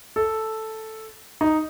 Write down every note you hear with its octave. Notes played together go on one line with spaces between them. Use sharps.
A4
D#4